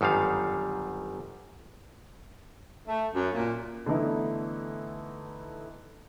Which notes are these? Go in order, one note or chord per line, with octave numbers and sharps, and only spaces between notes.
G1 F#2 D#3 G3 F5
A3
F#2
A#2
D3 E3 A3 B3 D#4 E4